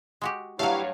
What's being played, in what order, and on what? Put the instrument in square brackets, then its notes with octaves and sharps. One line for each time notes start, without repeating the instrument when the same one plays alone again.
[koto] G#3 F#4 G4
[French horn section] G2 C#5 [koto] F#3 A3 [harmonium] E4 G4 [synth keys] F5